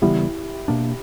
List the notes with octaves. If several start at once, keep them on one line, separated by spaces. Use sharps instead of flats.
C#3 E3 G3 B3 E4 G4
B2 A#3 D4